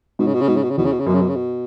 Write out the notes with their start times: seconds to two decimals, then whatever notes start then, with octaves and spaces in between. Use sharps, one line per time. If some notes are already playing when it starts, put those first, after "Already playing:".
0.19 G#2 B2
0.26 C#3
0.34 B2
0.41 C#3
0.48 G#2 B2
0.56 C#3
0.63 B2
0.70 C#3
0.77 E2 B2
0.84 C#3
0.92 B2
0.99 C#3
1.06 F#2 B2
1.14 C#3
1.21 B2
1.28 C#3
1.35 B2